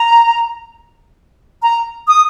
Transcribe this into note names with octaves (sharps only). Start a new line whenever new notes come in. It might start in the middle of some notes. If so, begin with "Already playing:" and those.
Already playing: A#5
A#5
D#6